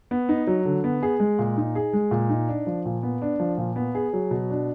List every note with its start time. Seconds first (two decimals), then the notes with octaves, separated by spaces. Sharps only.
0.11 B3
0.29 D#4
0.47 F#3
0.65 D3
0.84 B3
1.03 G#4
1.20 G#3
1.39 A#2
1.57 D#4
1.75 G#4
1.93 G#3
2.11 A#2
2.30 D#4
2.49 D4
2.67 F3
2.86 A#2
3.03 B3
3.22 D4
3.40 F3
3.58 A#2
3.76 B3
3.95 G#4
4.13 F#3
4.31 B2
4.50 D4